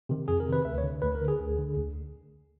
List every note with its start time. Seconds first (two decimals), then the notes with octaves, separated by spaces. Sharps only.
0.09 C3 D#3
0.28 F2 G#4
0.40 A#4
0.46 C3 D#3
0.53 B4
0.65 D2 E5
0.78 C#5
0.84 D3
1.02 D2 B4
1.15 A#4
1.21 D3
1.28 G#4
1.39 D2
1.59 D3
1.77 D2